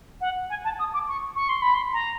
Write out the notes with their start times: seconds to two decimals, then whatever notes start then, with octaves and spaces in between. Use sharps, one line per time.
0.21 F#5
0.49 G#5
0.64 A5
0.78 D#6
0.93 D6
1.08 C#6
1.35 C#6
1.48 C6
1.61 B5
1.74 C6
1.93 A#5